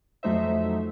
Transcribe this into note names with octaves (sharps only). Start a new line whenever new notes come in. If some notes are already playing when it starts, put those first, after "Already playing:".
F2 F#3 A3 D#4 C5 E5